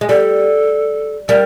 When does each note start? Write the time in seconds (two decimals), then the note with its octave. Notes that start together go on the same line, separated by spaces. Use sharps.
0.01 G#3
0.09 G3 A4
1.29 G3 A#4